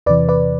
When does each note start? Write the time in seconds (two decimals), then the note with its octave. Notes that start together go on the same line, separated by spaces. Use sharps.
0.06 E2 C3 E3 B4 D5
0.29 B4 D5